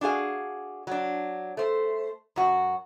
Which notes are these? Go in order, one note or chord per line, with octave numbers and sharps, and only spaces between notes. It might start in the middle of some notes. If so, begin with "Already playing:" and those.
D4 F#4 G#4 F5
F#3 D4
A3 C5
F#2 F#4